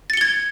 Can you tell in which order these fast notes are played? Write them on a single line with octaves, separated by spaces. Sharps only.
A6 C#7 G7 G#6